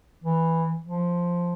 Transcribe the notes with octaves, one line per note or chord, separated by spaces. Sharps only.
E3
F3